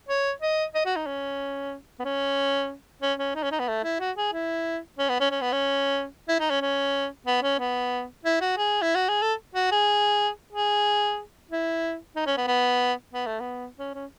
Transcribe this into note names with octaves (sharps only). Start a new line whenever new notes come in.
C#5
D#5
D#5
F#4
D#4
C#4
B3
C#4
C#4
C#4
D#4
C#4
D#4
B3
A3
E4
F#4
G#4
E4
C#4
B3
C#4
C#4
B3
C#4
E4
D#4
C#4
C#4
B3
C#4
B3
E4
F#4
G#4
E4
F#4
G#4
A4
F#4
G#4
G#4
E4
D#4
C#4
B3
B3
B3
A3
B3
C#4
C#4